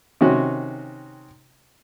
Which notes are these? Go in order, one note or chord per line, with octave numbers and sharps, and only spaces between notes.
C3 D#3 C#4 F#4